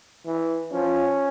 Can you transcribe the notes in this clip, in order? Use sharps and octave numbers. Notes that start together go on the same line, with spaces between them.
E3
F3 C#4